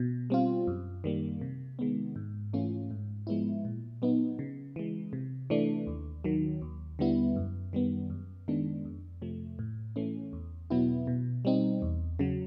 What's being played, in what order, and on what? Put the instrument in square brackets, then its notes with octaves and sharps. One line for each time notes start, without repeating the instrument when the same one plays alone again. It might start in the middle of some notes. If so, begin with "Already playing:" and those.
Already playing: [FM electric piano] B2
G3 C4 F4
F#2
D#3 G3 A#3
C3
D#3 G#3 B3
G#2
E3 A3 C#4 F4
G#2
F3 G#3 B3 E4
A#2
F#3 B3 D#4
C#3
E3 G#3
C3
E3 A3 D4
D#2
D#3 F#3
D#2
D3 G3 B3 E4
F#2
D#3 G3 B3
F#2
D#3 G#3 B3 D4
F2
C3 F3 A3
A2
E3 A3 C#4
E2
B2 F#3 B3 E4
B2
G3 C4 D#4
E2
C#3 F#3